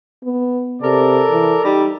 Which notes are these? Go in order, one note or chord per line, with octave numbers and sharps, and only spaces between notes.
B3
C3 A4 A#4 D5
E3
G3 D#4